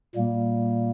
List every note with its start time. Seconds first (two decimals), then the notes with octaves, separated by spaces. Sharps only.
0.15 A#2 G3 A#3